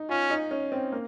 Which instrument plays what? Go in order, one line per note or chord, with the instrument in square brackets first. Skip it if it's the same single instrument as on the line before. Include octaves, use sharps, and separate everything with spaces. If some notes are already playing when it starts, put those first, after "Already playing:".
Already playing: [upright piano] D#4
[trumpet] C#4 [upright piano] F4
[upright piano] D#4
C#4
C4
A#3